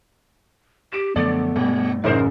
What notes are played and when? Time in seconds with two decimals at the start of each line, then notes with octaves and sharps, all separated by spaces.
0.93 G4 D7 E7
1.16 F#2 D3 F3 A3 B3 D5
1.56 G2 B2 G3 A3
2.04 A1 F#2 C#3 D#4 A#4 C5